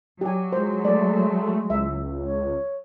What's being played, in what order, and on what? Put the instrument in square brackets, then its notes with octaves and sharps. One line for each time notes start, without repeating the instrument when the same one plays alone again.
[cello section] F#3 [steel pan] G4 G#5
[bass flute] G#3 [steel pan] C5
[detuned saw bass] A3 [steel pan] D5
[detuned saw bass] C#2 [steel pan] E5
[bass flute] C#5